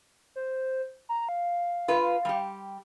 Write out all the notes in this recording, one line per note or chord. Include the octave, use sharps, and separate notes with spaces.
C5
A#5
F5
F4 B4
G3 G4